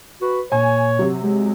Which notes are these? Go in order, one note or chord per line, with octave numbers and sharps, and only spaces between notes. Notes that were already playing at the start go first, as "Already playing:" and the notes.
F#4 B4
A#2 C#5 G#5
C3 F#3
G#3